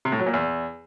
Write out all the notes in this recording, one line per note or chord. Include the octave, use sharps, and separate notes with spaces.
C3
A2
F#3
A#2
E2